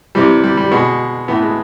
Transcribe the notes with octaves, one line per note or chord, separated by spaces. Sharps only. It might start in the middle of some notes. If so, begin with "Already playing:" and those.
C3 E3 G3
G3
G3
B2 G#3
A2 E3 B3
G#3